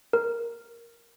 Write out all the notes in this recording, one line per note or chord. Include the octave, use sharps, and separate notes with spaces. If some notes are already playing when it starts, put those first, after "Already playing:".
A#4